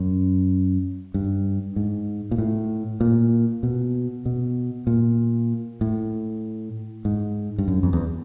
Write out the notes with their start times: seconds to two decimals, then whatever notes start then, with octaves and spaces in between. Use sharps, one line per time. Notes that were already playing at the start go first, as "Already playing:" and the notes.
Already playing: F#2
1.14 G2
1.76 G#2
2.31 A#2
2.38 A2
3.01 A#2
3.63 B2
4.26 B2
4.87 A#2
5.81 A2
7.05 G#2
7.58 G2
7.68 F#2
7.83 F2
7.93 E2